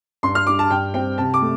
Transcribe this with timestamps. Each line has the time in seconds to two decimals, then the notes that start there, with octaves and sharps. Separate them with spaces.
0.23 G2 C6
0.35 F6
0.47 G3 D4 D6
0.59 A5
0.70 G2 G5
0.94 G3 C4 G5
1.18 C3 A5
1.34 D6
1.42 A3